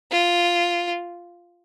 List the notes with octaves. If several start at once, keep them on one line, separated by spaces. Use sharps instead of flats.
F4